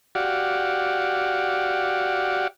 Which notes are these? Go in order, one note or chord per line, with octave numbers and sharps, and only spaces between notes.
F#4 G4 D5 F5 F#5